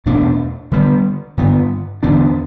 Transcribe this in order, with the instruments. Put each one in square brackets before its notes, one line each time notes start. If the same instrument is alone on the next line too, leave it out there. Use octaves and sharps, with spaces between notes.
[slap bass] E2 B2 A3 D4
D3 G3 B3
G2 D3 B3
E2 D3 B3 D4